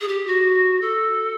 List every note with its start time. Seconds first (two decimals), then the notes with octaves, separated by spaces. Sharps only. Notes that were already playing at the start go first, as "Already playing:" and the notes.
0.01 G#4
0.08 G4
0.27 F#4
0.81 A4